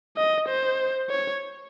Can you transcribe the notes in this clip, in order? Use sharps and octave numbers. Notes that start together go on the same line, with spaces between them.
D#5
C5
C#5